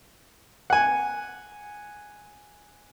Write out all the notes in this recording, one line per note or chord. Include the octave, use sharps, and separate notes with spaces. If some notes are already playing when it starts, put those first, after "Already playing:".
F#5 G#5